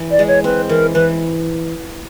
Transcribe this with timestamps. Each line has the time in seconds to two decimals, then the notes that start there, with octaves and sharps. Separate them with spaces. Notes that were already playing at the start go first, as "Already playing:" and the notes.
Already playing: E3
0.11 D5
0.19 G#3
0.28 C#5
0.44 C4 B4
0.69 E3 A#4
0.94 E3 B4